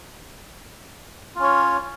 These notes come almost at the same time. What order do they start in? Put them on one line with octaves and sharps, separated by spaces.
F4 C#4 C#5